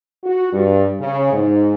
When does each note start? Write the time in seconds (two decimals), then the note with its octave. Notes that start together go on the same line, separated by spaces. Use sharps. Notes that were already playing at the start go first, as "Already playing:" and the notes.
0.24 F#4
0.52 G2
0.99 C#3
1.33 G#2